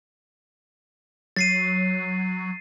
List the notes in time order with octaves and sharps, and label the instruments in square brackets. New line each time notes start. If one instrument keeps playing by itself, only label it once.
[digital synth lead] F#3 [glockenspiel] A6 C7 D#7